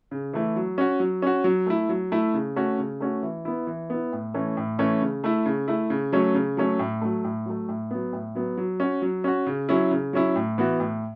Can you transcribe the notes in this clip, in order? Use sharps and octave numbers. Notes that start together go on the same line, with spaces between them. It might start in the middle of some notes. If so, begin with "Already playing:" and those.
C#3
E3 A3 E4
F#3
C#4 F#4
F#3
C#4 F#4
F#3
A3 E4
F#3
A3 E4
C#3
A3 C#4 F#4
C#3
A3 C#4 F#4
E3
B3 E4
E3
B3 E4
A2
E3 A3 C#4
A2
E3 A3 C#4
C#3
A3 E4
C#3
A3 E4
C#3
F#3 A3 C#4
C#3
F#3 A3 C#4
A2
F#3 A3
A2
F#3 A3
A2
F#3 B3
A2
F#3 B3
F#3
C#4 F#4
F#3
C#4 F#4
C#3
F#3 C#4 E4
C#3
F#3 C#4 E4
A2
E3 B3 F#4
A2